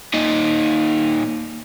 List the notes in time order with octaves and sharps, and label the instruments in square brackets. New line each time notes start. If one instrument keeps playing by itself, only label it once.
[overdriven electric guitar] A#2 D#4